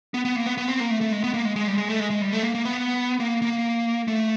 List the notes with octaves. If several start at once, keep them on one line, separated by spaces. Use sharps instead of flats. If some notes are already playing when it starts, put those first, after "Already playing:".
B3
B3
A#3
B3
B3
C4
A#3
A3
A3
G#3
B3
A#3
G#3
G#3
G3
G#3
A3
G#3
G#3
G3
A3
A#3
A#3
B3
A#3
A#3
A3